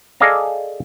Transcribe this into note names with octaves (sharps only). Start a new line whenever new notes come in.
G#4 A4 D5 D#5 F5 A#5